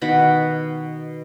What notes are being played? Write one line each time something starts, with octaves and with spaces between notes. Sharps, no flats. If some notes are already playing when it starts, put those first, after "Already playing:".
B2 D#3 F#5 B5